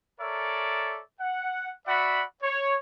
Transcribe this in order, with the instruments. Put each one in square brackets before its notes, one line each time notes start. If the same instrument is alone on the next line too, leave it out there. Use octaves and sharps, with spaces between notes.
[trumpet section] A4 A#4 C#5 D5 E5
F#5
F#4 D5 E5 F#5 B5
C#5